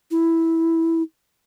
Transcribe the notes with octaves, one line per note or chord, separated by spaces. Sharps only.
E4